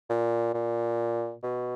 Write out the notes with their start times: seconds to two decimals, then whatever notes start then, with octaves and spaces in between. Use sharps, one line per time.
0.10 A#2
0.53 A#2
1.43 B2